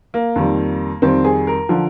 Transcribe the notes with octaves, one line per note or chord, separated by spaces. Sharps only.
A#3
F2 D#3 G3
F2 D#3 G3 C4
G#4
A#4
D3 F3